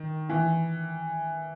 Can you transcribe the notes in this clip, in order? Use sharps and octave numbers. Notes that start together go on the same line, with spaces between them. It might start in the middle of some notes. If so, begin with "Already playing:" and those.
Already playing: D#3
E3